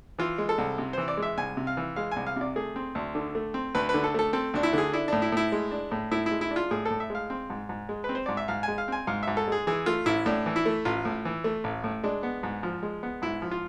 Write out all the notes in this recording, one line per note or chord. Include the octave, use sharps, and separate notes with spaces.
E3 F4
G#3
A4
C2
C3
E3 C5
D5
G#3
E5
C2 G#5
C3
F5
E3
G#3 F5
C2 G#5
F5
C3 D5
A3 G#4
C4
D2
D3
A3
C4
D2 B4
B4
D3
A4
A3 A4
C4 A4
D2 D4
E4
D3 G#4
D4 E4
A2 D4
E4
A2 E4
G#3
D4
A2
A2 E4
E4
G#3
E4
D4
F4
A2 G#4
A2 A4
E5
G#3 F5
C4
G#2
G#2
G#3
B4
C4
C5
G#2 D5
E5
G#2 F5
G#3 G#5
F5
C4 G#5
G#2 F5
G#2 E5
A4
G#3 G#4
E3 G#4
A3 F4
A1 E4
A2 D4
E3
E4
A3
A1 F4
A2
E3
A3
A1
A2
G#3 D4
B3
G#2
F3
G#3
B3
G#2 E4
F3
F4